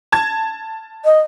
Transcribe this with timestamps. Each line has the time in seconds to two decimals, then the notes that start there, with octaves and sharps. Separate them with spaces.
0.12 A5 G#6
1.05 D#5